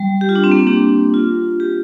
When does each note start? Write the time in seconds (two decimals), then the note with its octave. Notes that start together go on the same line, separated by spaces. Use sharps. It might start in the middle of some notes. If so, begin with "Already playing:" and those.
Already playing: G3
0.21 G4
0.29 F4
0.35 D4
0.44 C4
0.52 A#3
0.67 D4 G4
1.14 F4
1.60 G4